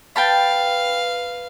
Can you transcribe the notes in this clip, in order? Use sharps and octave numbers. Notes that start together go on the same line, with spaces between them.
B4 F5 G5 A5 B5